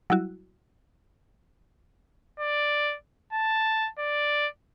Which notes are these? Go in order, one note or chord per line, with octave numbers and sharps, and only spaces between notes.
F#3 G3 E4 F#4
D5
A5
D5